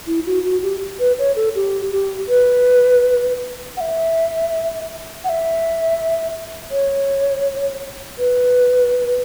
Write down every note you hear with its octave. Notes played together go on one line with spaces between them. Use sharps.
E4
F#4
F#4
G4
B4
C#5
A4
G4
G4
B4
F#5
E5
F#5
E5
C#5
B4